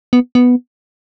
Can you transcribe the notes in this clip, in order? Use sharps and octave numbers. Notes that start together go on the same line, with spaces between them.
B3
B3